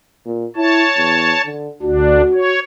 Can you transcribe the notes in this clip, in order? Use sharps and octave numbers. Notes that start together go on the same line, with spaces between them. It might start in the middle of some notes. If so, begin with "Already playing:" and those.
A#2
E4 C#5 A5
E2
D3
D2 D4 F#4
C#5